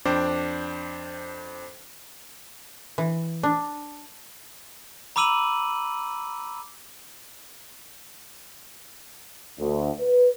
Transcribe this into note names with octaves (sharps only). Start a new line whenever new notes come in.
F2 D4 C5 G5 D6
E3
D4
A#5 B5 D6 E6 D#7 F#7
D2
B4